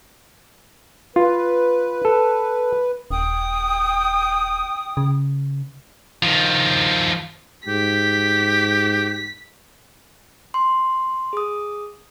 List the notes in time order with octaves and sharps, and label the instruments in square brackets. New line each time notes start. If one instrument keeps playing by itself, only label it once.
[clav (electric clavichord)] F4 [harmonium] B4
[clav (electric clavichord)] A4
[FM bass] D#1 [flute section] G5 D#6
[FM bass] C#3
[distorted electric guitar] D#3 F3
[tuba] G#2 [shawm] G4 [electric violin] B6
[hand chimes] C6
G#4 D#6